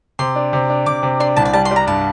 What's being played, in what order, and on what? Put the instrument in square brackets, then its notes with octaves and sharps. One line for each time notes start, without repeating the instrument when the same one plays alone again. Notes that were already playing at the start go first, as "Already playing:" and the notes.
[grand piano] C3 [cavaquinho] C6
[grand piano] D4
C3
D4
[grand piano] C3 [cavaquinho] D6
[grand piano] C3
[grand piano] D4 [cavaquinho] C6
[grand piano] C2 [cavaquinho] A5
[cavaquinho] D5
[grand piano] G3 [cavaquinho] A5
[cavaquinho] C6
[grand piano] G3
[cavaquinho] A#5
[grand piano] G2 [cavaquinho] A5